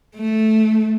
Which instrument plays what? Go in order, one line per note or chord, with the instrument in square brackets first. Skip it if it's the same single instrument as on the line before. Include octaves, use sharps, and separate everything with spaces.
[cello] A3